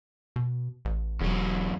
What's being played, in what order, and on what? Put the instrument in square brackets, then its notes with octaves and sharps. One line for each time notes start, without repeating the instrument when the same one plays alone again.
[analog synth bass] B2
A1
[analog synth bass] E1 [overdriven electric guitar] E2 F#3